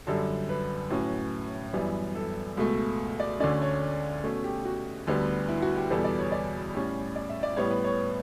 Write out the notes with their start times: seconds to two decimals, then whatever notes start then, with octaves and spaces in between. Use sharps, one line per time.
0.07 F#2 D3 G3 A4
0.49 B4
0.90 A2 F#3 C#4
1.73 F#2 E3 G3 B3
2.15 A4
2.57 C#2 B2 A3
3.20 D5
3.40 D2 D3 A3 C#4 D5
3.62 C#5
4.24 B2 A3 C#4
4.44 G4
4.65 F#4
5.07 D2 D3 G3 B3
5.48 E4
5.62 F#4
5.76 G4
5.90 E2 B2 G3 B3 A4
6.04 D5
6.18 C#5
6.32 D5
6.74 A2 G3 C#4
7.16 D5
7.29 E5
7.43 D5
7.56 A2 G3 B3 C#5
7.71 B4
7.84 C#5